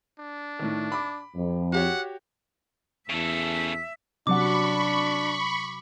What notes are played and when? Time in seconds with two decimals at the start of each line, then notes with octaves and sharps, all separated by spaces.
0.19 D4
0.59 A2 D#3
0.92 B5 D6
1.35 F2
1.73 F#4 G4 C#5 F#5
3.10 E2 C#3 A4 E5
4.27 C3 F#3 D4 F#5 B5 C#6 D6